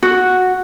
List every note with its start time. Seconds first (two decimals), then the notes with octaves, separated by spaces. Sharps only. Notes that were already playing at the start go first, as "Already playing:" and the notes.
0.03 F#4